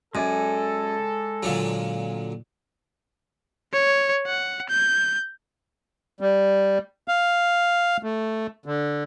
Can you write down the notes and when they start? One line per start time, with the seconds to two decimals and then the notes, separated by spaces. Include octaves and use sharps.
0.15 F#2 G#3 A4 D5 G#5
1.43 A#2 D3 F#3
3.73 C#5
4.27 F#5
4.69 G6
6.21 G3
7.08 F5
8.03 A3
8.66 D3